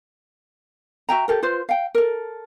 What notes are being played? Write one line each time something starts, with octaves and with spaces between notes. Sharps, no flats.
F#4 E5 G5 A#5
G4 A4 A#4
F4 B4 C5
F5 G5
A4 A#4